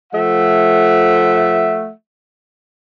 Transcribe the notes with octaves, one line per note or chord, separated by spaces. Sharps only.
F3 A3 E5 F#5